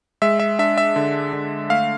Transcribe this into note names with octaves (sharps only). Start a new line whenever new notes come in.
G#3 E5
E5
D4 E5
E5
D3
D3
A3 F5